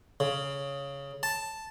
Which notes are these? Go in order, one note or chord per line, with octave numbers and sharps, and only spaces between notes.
C#3
A5